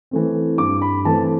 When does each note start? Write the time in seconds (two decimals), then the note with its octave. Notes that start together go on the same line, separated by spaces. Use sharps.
0.11 E3 A3 C4
0.58 G2 D6
0.82 B5
1.05 E3 A3 C4 A5